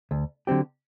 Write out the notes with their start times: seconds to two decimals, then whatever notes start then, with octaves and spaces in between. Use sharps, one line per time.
0.11 D2
0.47 D3 F#3 C4 G4